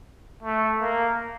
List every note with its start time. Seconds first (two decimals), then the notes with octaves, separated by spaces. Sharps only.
0.42 A3
0.81 A#3